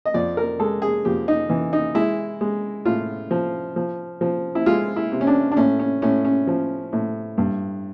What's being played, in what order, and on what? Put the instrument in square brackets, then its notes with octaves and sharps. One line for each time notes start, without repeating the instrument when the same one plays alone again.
[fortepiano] D#5
F2 D5
A#4
G#3 A4
G#4
F2 G4
D#4
E3
D#4
G#3 E4
G#3
A2 F4
F3
F3
F3
E4
G#3 F4
E4
C3
C#4
D4
D4
A2 C#4
C#4
A2 C#4
C#4
F3
A2
G2